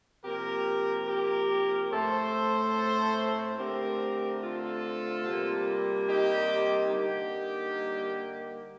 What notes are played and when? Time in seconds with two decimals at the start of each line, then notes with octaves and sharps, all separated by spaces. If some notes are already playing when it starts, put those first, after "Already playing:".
0.23 C3 F3 A#3 G4 A#4
1.07 G4 A#4
1.91 A2 A3 C4 A4 C5
3.57 D3 A3 C4 G4 A#4
4.41 F4 A4
5.25 C3 G3 A#3
6.08 D#4 G4
6.92 D3 G3 A#3 D#4 G4